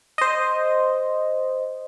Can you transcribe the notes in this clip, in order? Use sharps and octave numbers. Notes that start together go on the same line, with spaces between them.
C5 D#5